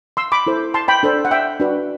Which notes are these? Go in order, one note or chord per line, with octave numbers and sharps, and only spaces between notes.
C6 E6
B5 D6
E4 A4 C5
A5 C6
G5 B5
D4 A4 C5
F#5
E5 G5
D4 F#4 B4